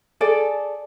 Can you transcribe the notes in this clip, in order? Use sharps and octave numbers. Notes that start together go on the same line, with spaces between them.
G#4 A4 D5